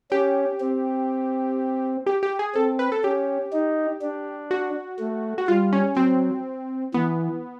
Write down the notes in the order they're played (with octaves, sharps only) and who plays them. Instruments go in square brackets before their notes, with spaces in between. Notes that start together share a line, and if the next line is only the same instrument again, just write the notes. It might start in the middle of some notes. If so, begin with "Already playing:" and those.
[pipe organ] C#4 [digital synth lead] G4
[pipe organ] C4
[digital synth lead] G4
G4
G#4
[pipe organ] C4 [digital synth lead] A4
[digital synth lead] B4
A4
[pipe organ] C#4 [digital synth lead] G4
[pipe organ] D#4
D4
[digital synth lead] F#4
[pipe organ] A3
[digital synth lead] F#4
[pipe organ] G3 [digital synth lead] F4
[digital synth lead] C#4
[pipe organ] F#3 [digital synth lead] C4
[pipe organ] E3 [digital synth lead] B3